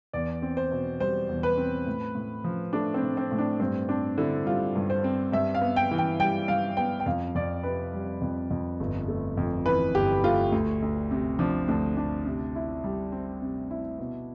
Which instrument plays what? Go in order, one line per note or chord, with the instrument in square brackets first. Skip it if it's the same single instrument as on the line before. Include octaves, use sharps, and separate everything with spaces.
[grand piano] E2 [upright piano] D5
[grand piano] C4
[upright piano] C5
[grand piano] B2
[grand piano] G3 [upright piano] C5
[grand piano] E2
[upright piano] B4
[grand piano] C4
A2
A2
F3
[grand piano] A3 [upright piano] D4
[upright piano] C4
[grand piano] A2
[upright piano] C4
[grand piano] A2
[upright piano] D4
[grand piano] G2 [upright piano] C4
[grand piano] C4 [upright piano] D4
[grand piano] D3 [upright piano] E4
[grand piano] G3 [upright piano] F4
[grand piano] G2
[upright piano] C5
[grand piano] C4
[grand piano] G2 [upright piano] E5
[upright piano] F5
[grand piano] B3
[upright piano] G5
[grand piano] E3
[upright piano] G5
[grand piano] G3 [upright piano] G5
[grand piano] G2 [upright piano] F5
[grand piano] B3 [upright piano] G5
[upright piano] G5
[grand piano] F2 [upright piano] F5
[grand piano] F2 [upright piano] D5
[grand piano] C3 [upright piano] B4
[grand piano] G3
F2
F2
G1
A3
F2
[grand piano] E3 [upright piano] B4
[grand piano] G1 [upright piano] G4
[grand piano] A3 [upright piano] F4
[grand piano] D2
D2
C3
[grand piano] F3 [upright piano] D4
[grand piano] D2 [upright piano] D4
[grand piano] D2 [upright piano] D4
[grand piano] C3
E4
G3
C4
C3
E4
B2